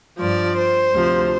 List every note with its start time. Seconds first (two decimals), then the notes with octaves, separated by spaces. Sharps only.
0.19 G2 F3 D5
0.56 C5
0.94 D2 C3 F3